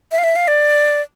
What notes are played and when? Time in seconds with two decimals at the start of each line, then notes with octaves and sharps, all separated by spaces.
0.11 E5
0.18 F5
0.24 E5
0.36 F5
0.48 D5